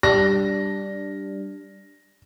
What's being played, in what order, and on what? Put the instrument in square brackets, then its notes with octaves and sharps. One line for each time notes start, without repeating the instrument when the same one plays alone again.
[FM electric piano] G3 D4 [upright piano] A#6